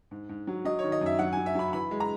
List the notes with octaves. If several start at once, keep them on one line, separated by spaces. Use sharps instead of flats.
G#2
G#2
F#3
F#3 D#5
D#3 C#5
D#5
F#2
E5
F#3 F#5
F#3 G#5
E5
F#3 B5
E3 B5
G#3
A#5